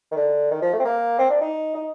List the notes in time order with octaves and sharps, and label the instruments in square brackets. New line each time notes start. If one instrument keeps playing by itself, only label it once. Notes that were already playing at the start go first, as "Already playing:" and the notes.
[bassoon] D#3
D3
D#3
F3
A3
C4
A#3
C4
D4
D#4
D#4